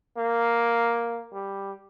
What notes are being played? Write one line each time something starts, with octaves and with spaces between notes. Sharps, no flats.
A#3
G3